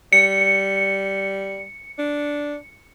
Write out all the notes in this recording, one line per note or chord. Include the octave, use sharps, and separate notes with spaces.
G3 C#7
D4